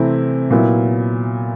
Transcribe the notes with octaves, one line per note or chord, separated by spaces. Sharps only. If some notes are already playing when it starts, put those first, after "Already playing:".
Already playing: C3 E3 A3 C4 E4
A#2 F#3 B3 E4